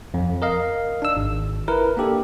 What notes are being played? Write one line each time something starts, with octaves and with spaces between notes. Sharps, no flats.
F2
A#4 D#5 F5
D4 E6
G#1
E4 A#4 B4
A#3 D4 G4 A4